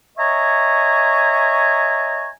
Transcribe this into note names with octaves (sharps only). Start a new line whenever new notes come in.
C#5 D#5 E5 G#5 A#5 C#6